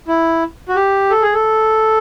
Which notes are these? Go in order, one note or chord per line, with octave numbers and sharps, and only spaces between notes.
E4
F#4
G4
A4
G#4
A4